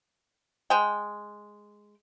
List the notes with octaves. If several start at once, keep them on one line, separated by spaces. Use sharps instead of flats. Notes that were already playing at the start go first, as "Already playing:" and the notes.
G#3 G5